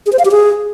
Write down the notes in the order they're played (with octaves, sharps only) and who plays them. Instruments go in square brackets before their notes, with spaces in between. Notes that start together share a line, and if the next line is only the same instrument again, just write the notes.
[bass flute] G#4
C5
F5
G4
G#4